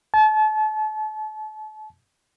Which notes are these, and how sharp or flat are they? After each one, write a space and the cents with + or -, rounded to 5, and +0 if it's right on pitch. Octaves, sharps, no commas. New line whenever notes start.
A5 -35